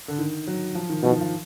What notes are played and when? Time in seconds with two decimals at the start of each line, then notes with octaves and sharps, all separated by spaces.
0.08 D3
0.19 D#3
0.47 F#3
0.75 F3
0.90 D#3
1.03 B2 F3
1.12 D#3
1.21 F3